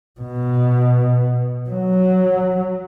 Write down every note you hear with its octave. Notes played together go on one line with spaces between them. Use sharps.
B2
F#3